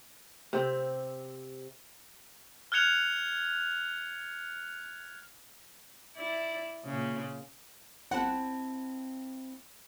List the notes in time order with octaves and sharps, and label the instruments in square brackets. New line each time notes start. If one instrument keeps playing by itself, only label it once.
[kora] C3 C4
[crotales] F6 F#6 G#6 C#7 F7
[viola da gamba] E4 D5
A#2 C#3
[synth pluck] G1 F#5 [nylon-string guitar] C4 E4 A5